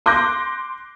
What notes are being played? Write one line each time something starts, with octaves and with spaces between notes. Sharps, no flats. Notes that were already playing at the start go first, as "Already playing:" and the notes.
C6 D6 F#6 G6 A#6